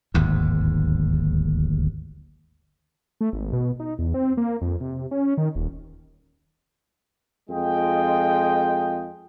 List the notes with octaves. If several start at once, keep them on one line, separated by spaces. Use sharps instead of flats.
D1 G#1 D#2 G#2
A3
G#1
B2
D#4
E2
C4
A#3
F2
C3
C#4
D#3
D#1
F2 G#3 F4 D#5 G5